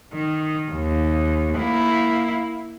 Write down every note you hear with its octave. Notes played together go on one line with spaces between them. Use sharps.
D#3
D#2
A#3 E4